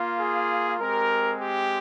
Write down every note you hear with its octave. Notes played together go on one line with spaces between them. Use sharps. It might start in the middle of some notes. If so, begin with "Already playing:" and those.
Already playing: A#3 F4
G#4
G#3 C4 G4 A#4
G4